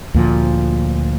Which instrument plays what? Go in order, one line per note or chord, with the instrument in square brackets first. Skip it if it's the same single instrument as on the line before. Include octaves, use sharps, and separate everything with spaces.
[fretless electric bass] D2 A#2 F3